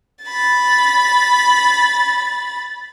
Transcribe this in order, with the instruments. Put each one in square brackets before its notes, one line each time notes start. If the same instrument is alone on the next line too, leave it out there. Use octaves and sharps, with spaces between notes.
[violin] B5 A6